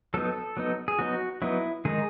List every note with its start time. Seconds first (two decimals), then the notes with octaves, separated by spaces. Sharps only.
0.14 F#3 B3 D#4 A4
0.57 F#3 B3 D#4
0.88 G#4
0.99 F#3 B3 D#4 F#4
1.42 F#3 B3 D#4 E4
1.85 D#3 G#3 D#4 G#4